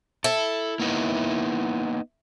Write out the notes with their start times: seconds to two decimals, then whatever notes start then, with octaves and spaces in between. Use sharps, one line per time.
0.24 E4 A4
0.79 A#3 B3 D#4